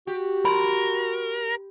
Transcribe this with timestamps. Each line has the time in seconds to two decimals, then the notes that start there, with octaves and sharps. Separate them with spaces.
0.07 F#4 G4
0.45 A#4 B5 C6